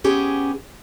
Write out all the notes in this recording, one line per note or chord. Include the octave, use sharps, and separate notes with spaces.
B3 C#4 G4 G#4